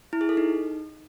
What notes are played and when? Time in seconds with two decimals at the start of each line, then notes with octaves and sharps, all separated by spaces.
0.13 E4
0.21 G#4
0.29 A4
0.37 D#4